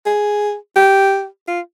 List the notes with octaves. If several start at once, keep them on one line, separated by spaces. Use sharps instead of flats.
G#4
G4
F4